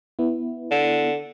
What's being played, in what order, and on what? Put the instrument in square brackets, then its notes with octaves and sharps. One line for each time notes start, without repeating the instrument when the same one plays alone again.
[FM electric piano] B3 E4
[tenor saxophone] D3